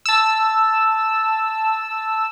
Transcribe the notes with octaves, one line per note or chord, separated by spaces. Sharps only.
A5 E6